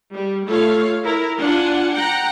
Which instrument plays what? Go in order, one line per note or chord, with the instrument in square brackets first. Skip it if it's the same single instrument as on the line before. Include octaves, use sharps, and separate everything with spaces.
[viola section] G3
A3 F4 A4 C#5 F5
E4 A#4
D4 F4 F#5 G#5
F#5 G5 A#5